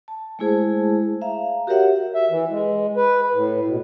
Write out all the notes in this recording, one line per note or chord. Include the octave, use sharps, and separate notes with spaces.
A5
G#3 A3 E4 G#4 C5 A5
E5 F5 A#5
F#4 G4 A#4 C#5 E5 F#5
E5
E3
G#3
B4
A2
B2